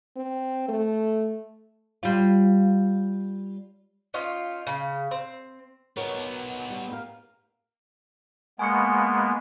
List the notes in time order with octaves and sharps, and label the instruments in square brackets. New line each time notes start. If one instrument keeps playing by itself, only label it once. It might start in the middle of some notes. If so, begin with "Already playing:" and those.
[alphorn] C4
A3
[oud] G3 F4
[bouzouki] C#4 D#4 F4 F5
C#3
C4
[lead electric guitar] B3 D#4 [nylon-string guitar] F#4 A#4 C#5
[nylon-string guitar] G3
G4 A#4 F5
[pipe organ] G#3 A#3 B3 [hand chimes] G#5 C#6 C#7